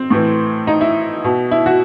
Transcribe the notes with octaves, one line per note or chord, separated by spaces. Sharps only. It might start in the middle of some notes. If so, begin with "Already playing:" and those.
Already playing: C4
A2 E3
D#4
E4
B2
E4
F#4